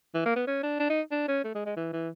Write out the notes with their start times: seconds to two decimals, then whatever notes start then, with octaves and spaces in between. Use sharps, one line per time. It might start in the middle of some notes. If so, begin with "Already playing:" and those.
0.14 E3
0.26 A#3
0.36 B3
0.47 C#4
0.63 D4
0.79 D4
0.90 D#4
1.11 D4
1.28 C#4
1.44 A3
1.55 G#3
1.66 G#3
1.76 E3
1.92 E3